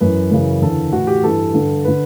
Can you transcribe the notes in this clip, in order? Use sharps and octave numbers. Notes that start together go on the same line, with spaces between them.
F#2 E3 B4
F#2 C#3 E3
E2 D3 A4
A2 E3 F#4
G4
G2 E3 A4
G2 D3
D3 B4